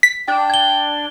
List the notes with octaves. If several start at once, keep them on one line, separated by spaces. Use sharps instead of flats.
B6
D4 G5
G#6 G7